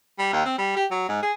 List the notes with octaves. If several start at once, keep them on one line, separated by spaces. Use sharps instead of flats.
G3
D#2
C4
G3
G4
F#3
G#2
G#4